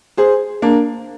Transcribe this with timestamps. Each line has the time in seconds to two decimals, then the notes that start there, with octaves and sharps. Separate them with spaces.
0.17 G#4 C5
0.62 A#3 D4